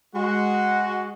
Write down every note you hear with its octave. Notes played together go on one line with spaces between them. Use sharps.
G#3 F#4